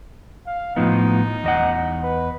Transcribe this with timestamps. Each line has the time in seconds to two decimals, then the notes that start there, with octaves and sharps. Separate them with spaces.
0.47 F5
0.76 A2 F3 B3 D#4
1.44 E2 D#5 F#5
2.03 B4